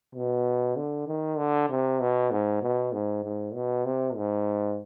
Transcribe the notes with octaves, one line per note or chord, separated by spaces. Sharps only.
B2
D3
D#3
D3
C3
B2
G#2
B2
G#2
G#2
B2
C3
G#2